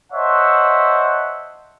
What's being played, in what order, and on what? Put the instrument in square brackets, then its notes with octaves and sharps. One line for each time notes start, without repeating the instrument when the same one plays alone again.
[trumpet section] C5 C#5 D#5 E5 F#5 A5